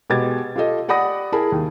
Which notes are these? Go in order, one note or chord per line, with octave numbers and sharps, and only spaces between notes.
B2 G#3 G4 B4 G#6 A6
F4 G4 A4 D#5
G4 D5 F#5 B5 D#6 A#6
E4 G#4 A#4 G#5 A5 B5
D#2